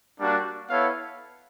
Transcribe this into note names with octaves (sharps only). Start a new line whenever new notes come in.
G3 A#3 D4 F#4
B3 E4 A4 C#5 F5